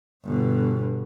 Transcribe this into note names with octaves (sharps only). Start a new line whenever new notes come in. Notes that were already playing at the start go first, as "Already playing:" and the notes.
G1 B2